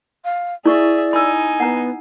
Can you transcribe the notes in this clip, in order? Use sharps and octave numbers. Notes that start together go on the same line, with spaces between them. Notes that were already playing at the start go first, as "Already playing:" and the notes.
F5
E4 G#4 D5 E5 C#6
D#4 G#5 B5 E6
B3 F#5 A#5